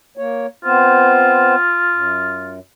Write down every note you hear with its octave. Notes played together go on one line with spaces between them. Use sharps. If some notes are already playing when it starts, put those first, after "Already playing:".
A#3 C#5
B3 C4 F4 C5
F#2